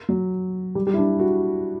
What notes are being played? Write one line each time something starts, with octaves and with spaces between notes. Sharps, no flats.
F#3
G3
G3
E4
D4
F#4